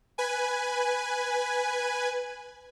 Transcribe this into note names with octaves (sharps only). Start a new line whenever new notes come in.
B4 G#5